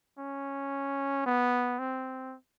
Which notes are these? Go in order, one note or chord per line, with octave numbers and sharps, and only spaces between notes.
C#4
B3
C4